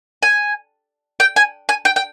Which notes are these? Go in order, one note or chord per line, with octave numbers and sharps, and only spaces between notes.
G#5
G5
G#5
G#5
G5
G5